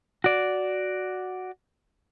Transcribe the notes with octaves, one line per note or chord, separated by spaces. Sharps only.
F#4 D5